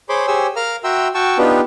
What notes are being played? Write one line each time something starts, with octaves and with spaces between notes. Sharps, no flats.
G#4 C5 C#5 B5 C6 D6
G4 G#4 C5 C#5 G#5 E6
A#4 F5 A#5 F6
F#4 E5 G5 A#5 C6 E6
F#4 G5 A5 C#6 E6
B3 D4 D#4 F4 G4 B4